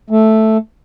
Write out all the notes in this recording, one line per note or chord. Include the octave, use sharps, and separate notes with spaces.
A3